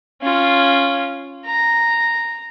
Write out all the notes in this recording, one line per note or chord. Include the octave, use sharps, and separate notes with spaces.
C#4 F4
A#5